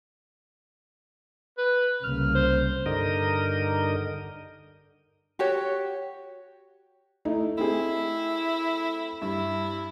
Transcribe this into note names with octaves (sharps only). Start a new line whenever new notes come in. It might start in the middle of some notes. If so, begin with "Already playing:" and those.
B4
C2 C#3 A#3 F6
C5
G2 D3 D#4 A#4 D#5
F#4 G4 C#5
A3 D#4 E4
A3 C4 E4 G#4
G2 E4